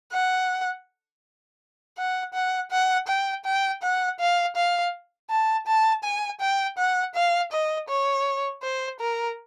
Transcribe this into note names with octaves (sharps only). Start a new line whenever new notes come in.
F#5
F#5
F#5
F#5
G5
G5
F#5
F5
F5
A5
A5
G#5
G5
F#5
F5
D#5
C#5
C5
A#4